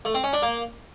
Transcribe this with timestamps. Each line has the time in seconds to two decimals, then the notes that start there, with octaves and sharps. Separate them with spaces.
0.05 A3
0.14 C4
0.24 C#4
0.33 D4
0.42 A#3